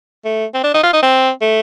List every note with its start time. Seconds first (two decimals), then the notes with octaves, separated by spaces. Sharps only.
0.25 A3
0.54 C4
0.64 D4
0.74 D#4
0.83 F4
0.93 D#4
1.03 C4
1.42 A3